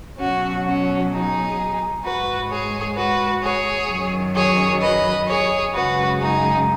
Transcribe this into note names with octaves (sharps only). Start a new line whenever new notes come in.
B2 F#3 C#4 F#4
C#4 F#4
D#4 G#4
G#2 G#3 F#4 B4
G#4 C#5
F#4 B4
G#4 C#5
F#2 D#3 F#3
G#4 C#5
B4 D#5
G#4 C#5
F#2 C#3 G#3 F#4 B4
D#4 G#4